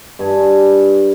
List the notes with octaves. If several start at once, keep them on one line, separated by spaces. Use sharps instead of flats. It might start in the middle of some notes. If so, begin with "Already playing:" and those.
G2 G#5